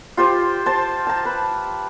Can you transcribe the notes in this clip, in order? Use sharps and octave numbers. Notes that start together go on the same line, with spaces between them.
F4 G4 C5
C5 A5
A5 A#5
B4